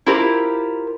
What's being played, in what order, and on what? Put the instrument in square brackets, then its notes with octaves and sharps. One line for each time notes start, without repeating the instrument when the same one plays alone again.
[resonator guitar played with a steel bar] E4 F4 G4 A#4 C5